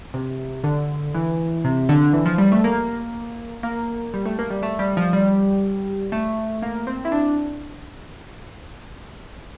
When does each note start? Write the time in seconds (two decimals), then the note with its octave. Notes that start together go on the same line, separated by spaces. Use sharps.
0.14 C3
0.64 D3
1.15 E3
1.64 C3
1.89 D3
2.13 E3
2.26 F3
2.38 G3
2.52 A3
2.64 A#3
3.63 A#3
4.14 G3
4.25 A3
4.39 A#3
4.50 G3
4.63 A3
4.79 G3
4.97 F3
5.13 G3
6.12 A3
6.62 A#3
6.87 C4
7.05 E4
7.12 D4